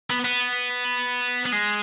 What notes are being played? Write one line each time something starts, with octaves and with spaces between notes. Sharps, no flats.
B3
B3
B3
G#3